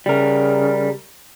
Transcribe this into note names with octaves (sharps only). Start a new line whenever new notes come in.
C#3 G3 A#4